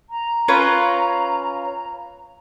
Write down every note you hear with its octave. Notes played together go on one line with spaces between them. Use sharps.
A#5
C#4 F4 B4